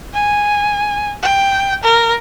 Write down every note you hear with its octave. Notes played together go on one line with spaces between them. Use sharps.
G#5
G5
A#4